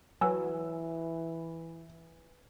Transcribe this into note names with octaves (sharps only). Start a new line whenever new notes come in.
E3 F#3 B4 G#5 E6